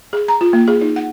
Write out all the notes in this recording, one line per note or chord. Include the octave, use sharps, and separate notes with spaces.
G#4
A#5
F4
A#3
G#4
D#4
F#5